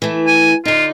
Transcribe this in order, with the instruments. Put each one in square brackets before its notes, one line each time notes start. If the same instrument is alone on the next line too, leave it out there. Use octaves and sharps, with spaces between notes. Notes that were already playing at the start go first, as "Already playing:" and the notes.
[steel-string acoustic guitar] E3 A3
[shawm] G#5
[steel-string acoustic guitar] D3 D#4 [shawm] F4